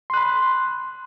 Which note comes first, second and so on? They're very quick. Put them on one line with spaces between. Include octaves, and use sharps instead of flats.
C6 F#6 B5